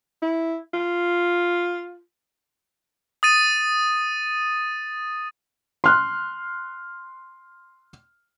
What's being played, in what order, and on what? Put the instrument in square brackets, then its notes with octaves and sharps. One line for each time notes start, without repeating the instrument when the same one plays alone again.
[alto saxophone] E4
F4
[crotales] D#6 A6 D#7
[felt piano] C6 F6 F#6